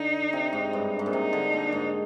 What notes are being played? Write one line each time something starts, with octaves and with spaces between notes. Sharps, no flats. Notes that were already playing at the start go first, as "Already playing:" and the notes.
Already playing: D3 D#4
C3
G#2
G2
G#2
A#2
C3 D#4
D3
A#2
G#2